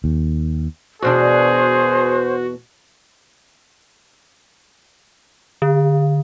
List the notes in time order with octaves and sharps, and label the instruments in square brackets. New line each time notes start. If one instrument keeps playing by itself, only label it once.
[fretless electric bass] D#2
[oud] E2 B2 D4 [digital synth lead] F#4 [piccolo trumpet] G#4 [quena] C5
[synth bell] D3